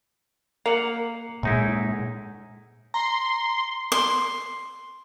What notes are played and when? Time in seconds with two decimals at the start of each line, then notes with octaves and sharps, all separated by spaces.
0.66 A#3 F5 F#5
1.43 F#2 A#2 G#3 D#4 E4
2.94 A#5 C6
3.92 C6